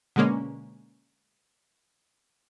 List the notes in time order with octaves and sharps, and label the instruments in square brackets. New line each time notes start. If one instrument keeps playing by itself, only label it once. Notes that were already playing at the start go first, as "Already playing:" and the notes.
[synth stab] B2 D3 G#3 A#3 C#4